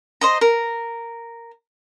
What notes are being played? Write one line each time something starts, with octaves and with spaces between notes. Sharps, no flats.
C5 D#5 A#5
A#4